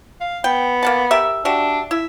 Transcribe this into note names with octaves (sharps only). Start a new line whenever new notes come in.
F5
B3 G5
A#3 F#5 A5
G4 A#4 E5
D4 F#4 G4 E5
E4 E5